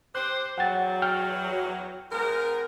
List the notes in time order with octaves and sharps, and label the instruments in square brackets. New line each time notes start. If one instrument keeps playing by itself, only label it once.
[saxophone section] G4 C5 [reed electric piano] F#6
[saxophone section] E2 F#3 [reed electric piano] F#5 G5 A6
[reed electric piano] G5 F6
[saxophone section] G#2 B3 A#4